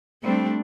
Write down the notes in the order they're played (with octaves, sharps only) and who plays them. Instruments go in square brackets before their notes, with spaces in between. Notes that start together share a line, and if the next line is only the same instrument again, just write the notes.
[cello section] G3 C4 [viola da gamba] A3 D4